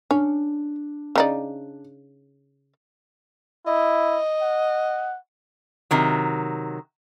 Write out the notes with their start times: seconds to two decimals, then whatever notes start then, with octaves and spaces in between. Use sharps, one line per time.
0.11 C#4 D4
1.16 C#3 D#4 D5
3.67 E4 D#5
4.42 F#5
5.91 C3 D#3 F#3